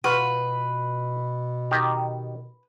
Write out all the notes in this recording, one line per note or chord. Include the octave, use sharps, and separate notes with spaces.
B2 F4 F#4 B4
D#3 G4 A#5